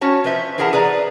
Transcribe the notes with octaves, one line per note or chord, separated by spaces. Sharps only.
C#4 F#4 C#5 A5
F3 B4 C5 E5
E3 E4 G#4 A#4 F#5 A5
G#4 B4 D5 A#5